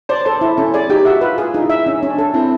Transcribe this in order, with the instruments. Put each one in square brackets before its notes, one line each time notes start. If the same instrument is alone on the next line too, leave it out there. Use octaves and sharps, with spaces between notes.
[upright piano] C5 [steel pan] D5
[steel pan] A4 [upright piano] C5
[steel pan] E4
[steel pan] C#4 [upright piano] A4
[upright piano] G#4 [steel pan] D5
[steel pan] D#4 [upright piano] G4
[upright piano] F#4 [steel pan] E5
[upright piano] F4 [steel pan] B4
[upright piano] F4 [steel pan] G#4
[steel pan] D#4
[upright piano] E4
[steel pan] E5
[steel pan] C#4 [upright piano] D#4
[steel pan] C#4
[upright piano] D4
[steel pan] A4
[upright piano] C4 [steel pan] E4